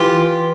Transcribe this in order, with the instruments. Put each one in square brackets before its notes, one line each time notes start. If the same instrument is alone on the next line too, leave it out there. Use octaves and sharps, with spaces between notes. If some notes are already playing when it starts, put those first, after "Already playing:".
Already playing: [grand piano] E3 [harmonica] F4 G4